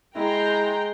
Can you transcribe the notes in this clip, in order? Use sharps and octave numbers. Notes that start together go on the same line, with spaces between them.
G#3 E4 G5 A#5 C6